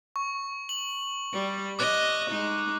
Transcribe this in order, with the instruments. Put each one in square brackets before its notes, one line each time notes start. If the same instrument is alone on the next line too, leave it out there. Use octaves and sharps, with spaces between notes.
[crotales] C#6
F#7
[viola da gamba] G3
[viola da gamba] D#5 [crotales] D6 F#6
[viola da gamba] G#3 D#4